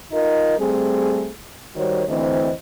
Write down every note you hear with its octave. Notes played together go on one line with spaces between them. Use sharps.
D#4 F4 A#4 D#5
G3 A3 C4 G#4
D#3 G3 F#4 C5 C#5
D2 E3 C4 C5 D#5